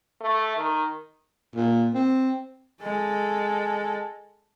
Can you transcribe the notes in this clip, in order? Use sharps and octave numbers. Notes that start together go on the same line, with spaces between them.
A3
D#3
A#2
C4
G#3 A4